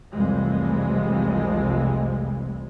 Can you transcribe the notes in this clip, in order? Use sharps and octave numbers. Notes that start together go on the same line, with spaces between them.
F1 C2 F2 E3 G3 G#3